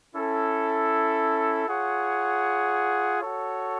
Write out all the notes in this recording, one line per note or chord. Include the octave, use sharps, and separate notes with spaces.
C#4 E4 A4
F4 G#4 C#5 F#5
F#4 A4 C#5